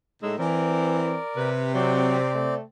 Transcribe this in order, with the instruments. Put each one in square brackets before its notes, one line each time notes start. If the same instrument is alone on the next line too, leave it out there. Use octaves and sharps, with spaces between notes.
[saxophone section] A2 [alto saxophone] G#3 [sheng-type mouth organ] D#4 E6
[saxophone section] E3 [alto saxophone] C4 [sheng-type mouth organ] A#4 D5
[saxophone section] C3 [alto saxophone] B4
[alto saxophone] F#3 [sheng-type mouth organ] C4 D5
[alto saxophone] A3